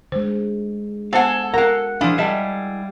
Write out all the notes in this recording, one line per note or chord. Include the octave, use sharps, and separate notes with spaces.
D3 G#3 C5
B3 A4 C5 F5 F#5 G#5 A5
A#4 F5 F#5 A#5
F3 D4 E4 G#4 F5
G3 D#5 E5 A5